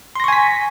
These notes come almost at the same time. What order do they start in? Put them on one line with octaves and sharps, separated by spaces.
C6 A#6 C#6 G#5 B6